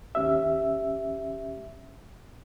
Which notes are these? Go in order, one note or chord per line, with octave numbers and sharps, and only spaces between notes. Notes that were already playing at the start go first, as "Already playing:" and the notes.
D#2 C#4 G4 E5